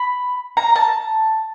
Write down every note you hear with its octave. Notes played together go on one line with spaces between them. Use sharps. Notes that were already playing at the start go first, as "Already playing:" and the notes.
Already playing: B5
A#5
A5